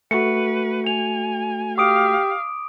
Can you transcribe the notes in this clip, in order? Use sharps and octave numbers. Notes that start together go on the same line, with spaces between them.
A3 F#4 B4 C#7
G#5 F7
G4 F5 D6 D#6 D7